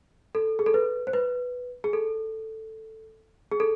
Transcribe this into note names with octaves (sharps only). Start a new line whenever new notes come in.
A4
G#4
A4
B4
C5
B4
G#4
A4
G#4
A4